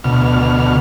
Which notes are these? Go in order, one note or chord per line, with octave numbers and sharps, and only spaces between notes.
D2 B2 F6